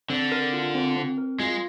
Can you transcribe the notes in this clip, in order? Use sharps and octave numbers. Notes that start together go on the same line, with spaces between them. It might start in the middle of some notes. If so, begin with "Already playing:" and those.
D3 C4
A#4
F4
C4
C4
A#4
G#3 F4